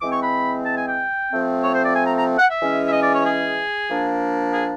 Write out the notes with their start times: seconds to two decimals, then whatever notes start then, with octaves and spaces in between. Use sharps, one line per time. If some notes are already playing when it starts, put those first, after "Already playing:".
0.02 E3 G#3 C4 D6
0.12 C#6
0.23 B5
0.66 A5
0.77 G#5
0.88 G5
1.31 F3 A3 C4
1.63 C#5
1.74 C5
1.85 D5
1.95 G#5
2.06 A#5
2.17 A#5
2.39 F#5
2.49 E5
2.60 E3 G#3 C#4
2.87 E5
2.92 D#5
3.03 D5
3.14 C#5
3.25 G#4
3.89 F3 A#3 D4
4.54 G#4